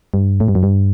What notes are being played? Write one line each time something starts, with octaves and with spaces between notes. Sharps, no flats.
G2
A2
G2
F#2
G2